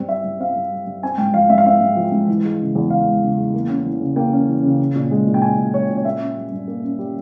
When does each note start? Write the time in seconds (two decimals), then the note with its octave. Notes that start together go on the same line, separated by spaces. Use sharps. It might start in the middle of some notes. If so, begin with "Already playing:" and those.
Already playing: G2 C4
0.09 G3 E5
0.24 G2
0.40 C4 F5
0.56 G2
0.72 G3
0.86 G2
1.03 C4 G#5
1.18 G#2 G5
1.34 F3 F5
1.50 G#2 E5
1.58 F5
1.66 C4 E5
1.81 G#2
1.97 F3
2.12 G#2
2.28 E3
2.44 G#3
2.60 C#3
2.75 E2
2.90 E3 F5
3.07 G#3
3.22 C#3
3.37 E2
3.54 A#3
3.69 C#4
3.86 E3
4.00 C#3
4.16 A#3 G5
4.32 C#4
4.48 E3
4.63 C#3
4.79 C#4
4.95 A#2
5.11 G#3
5.27 A#2
5.34 G5
5.42 C#4 G#5
5.58 A#2
5.74 G#3 C#5
5.90 A#2
5.97 C#5
6.05 A#3 E5
6.20 C#4
6.36 G3
6.52 G2
6.68 A#3
6.84 C#4
6.99 G3